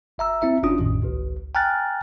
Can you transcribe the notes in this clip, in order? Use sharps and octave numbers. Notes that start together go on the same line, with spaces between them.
G1 E5 A#5 E6
C4 E4 E5
G1 C#4 D4 F4 D#6
A1 F2 A2 D#3
G#1 C#2
G5 G#5 A#5 F6 F#6 A6